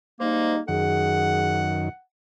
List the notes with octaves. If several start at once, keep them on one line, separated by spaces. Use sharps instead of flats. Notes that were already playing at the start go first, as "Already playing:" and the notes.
G3 G#3 A#3 D#4 C5
F#2 D#3 G#4 F#5